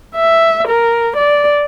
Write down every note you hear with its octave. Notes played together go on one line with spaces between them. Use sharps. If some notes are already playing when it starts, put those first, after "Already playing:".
E5
A#4
D5